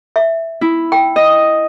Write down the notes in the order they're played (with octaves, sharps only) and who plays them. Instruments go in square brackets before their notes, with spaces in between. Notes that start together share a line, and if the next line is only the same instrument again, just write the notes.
[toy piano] E5
[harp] E4
[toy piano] G5
[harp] D#5